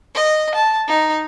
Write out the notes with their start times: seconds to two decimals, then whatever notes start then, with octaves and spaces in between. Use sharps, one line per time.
0.15 D#5
0.54 A5
0.88 D#4